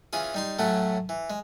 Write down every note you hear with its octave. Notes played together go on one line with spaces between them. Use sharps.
E3 C#4 F4 G#4
G3 D#4 C6
A2 F#3 A3 C#4 F#4
E3
G#3